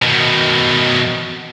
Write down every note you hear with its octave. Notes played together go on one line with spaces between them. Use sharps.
B2 D#3